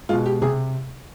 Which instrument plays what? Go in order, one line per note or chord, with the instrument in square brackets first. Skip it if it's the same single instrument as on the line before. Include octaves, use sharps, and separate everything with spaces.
[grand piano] B2 G#3 [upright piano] F4
[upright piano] G4
[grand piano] C3 [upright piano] G#4